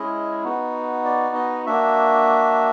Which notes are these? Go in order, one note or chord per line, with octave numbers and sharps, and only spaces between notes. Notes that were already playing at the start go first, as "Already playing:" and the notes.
Already playing: G#3 C#4 E4 G#4 D#5
B3 D#4 F#4
D5
D#5
A#3 D4 F#4 E5